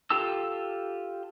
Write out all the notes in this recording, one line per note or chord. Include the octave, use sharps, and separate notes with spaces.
F4 G4 A4 A5 E6